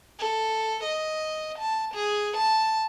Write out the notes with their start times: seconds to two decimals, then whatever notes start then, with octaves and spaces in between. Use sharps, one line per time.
0.19 A4
0.84 D#5
1.59 A5
1.95 G#4
2.37 A5